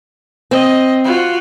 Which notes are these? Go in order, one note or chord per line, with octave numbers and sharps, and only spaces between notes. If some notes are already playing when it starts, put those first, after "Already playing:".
C4 D#5
F4 F#4